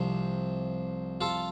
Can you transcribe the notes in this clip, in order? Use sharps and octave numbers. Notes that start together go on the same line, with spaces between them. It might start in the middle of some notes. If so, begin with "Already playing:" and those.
Already playing: C2 C3 F3
F4 A4